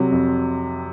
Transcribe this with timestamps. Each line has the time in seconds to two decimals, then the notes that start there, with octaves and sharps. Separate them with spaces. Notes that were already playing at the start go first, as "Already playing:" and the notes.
Already playing: C2 C3 F#3
0.11 F2